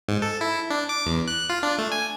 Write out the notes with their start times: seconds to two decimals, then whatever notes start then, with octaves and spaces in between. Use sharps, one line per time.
0.08 G#2
0.22 A4
0.41 E4
0.70 D4
0.89 D6
1.06 E2
1.28 F#6
1.49 F4
1.63 D4
1.78 A3
1.92 G#5